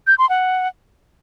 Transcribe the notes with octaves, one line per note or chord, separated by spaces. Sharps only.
G6
C6
F#5